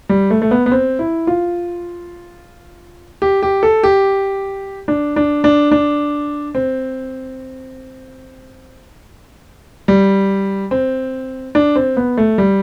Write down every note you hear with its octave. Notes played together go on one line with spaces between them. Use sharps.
G3
A3
A3
B3
B3
C4
E4
F4
G4
G4
A4
G4
D4
D4
D4
D4
C4
G3
C4
D4
C4
B3
A3
G3